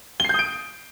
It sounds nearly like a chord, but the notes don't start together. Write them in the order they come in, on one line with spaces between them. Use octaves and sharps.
G7 C7 G6 D#6 D7